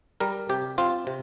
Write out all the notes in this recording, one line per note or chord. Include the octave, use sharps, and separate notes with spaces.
G3 A#4
C3 G4
C4 F4
C3